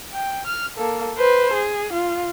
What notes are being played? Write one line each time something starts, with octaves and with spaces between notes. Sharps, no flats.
G5
F6
A#3 A4
B4 C5
G#4
F4